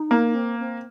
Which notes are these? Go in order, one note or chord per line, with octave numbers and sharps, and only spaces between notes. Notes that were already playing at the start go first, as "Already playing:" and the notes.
Already playing: D#4
A#3
C4
C4